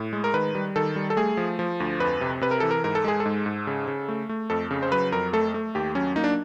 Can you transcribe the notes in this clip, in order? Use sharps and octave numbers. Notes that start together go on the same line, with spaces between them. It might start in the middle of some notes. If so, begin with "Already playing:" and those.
Already playing: A2
G#3
A#4
D#3 B4
G3
D#3 A4
G3
A4
A3 G#4
F3
F3
D2
F2 B4
C3
C3 B4
A#4
E3 A4
A#4
G#2 A#4
A4
G#3 G#4
A4
G#2
G#2
C#3
C#3
A3
A3
F2 A4
C#3
C5
F#3 B4
F2 A#4
A3 A4
A3
D#2 G4
F#3 C#4
A#3 D#4
D4